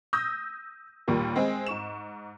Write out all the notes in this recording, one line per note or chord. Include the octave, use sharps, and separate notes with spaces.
D#6 E6 G6 A#6
D#2 A#2 G3 A#3
G#3 C4 G#4
G#2 C#6 E7